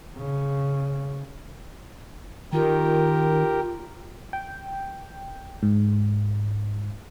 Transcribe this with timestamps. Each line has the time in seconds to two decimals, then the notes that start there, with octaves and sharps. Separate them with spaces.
0.17 C#3
2.53 D#3 F4 G4 A#4
4.33 G5
5.63 G#2